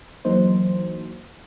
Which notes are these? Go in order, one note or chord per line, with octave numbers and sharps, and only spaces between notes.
E3 F#3 A#3 D#4 C5